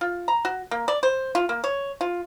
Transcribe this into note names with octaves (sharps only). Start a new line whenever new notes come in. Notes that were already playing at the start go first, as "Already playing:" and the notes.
F4
A#5
F#4
A#3
D5
C5
F4
A#3
C#5
F4